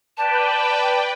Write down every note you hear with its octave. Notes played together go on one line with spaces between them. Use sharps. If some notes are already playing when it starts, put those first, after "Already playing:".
B4 D5 G5 A5